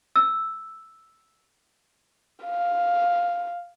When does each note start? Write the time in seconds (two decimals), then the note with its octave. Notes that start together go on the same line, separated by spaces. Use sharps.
0.16 E6
2.44 F5